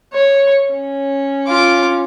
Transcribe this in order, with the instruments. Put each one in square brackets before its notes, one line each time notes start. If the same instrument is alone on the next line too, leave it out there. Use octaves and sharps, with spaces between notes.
[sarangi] C#5
C#4
[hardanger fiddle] F4 D6